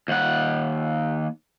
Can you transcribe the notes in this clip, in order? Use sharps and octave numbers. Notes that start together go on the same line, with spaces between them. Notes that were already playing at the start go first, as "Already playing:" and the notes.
D#2 F#5